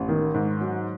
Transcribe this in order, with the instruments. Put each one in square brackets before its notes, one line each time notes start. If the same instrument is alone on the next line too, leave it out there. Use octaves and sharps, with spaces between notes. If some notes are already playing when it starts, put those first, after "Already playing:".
Already playing: [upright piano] A1
D#3
G#2
F#3